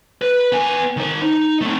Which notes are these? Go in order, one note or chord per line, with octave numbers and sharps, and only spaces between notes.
B4
B3 G#5
D#3 C5
D#4
A3 C4